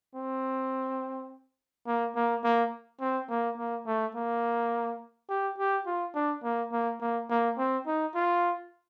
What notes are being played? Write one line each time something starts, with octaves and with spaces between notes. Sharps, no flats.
C4
A#3
A#3
A#3
C4
A#3
A#3
A3
A#3
G4
G4
F4
D4
A#3
A#3
A#3
A#3
C4
D#4
F4